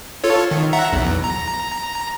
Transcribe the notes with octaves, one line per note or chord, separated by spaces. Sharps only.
F4 A4 C#5
D#3
E5 F#5 A#5
B1 E2
A#5